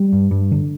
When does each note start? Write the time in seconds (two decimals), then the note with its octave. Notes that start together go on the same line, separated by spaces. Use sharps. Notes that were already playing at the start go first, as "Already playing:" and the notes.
Already playing: G3
0.13 G2
0.31 G2
0.51 D3